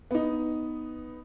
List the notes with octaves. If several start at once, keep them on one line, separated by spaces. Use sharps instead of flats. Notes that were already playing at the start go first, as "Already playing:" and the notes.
B3 D#4